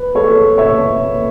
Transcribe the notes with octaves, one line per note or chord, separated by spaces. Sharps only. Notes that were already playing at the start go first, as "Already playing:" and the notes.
Already playing: B4
A4 C#5
C#5 E5